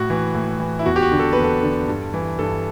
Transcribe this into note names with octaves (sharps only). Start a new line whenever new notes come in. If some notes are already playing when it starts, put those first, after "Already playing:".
Already playing: A2 F#4
E3
A2
E3
E4
E2 F#4
G4
F#4
D3
A4
E2 B4
A4
D3
G2
E3
G2 A4